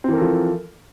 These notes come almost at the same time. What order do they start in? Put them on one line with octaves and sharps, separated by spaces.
C4 E3 A#4 A4 F3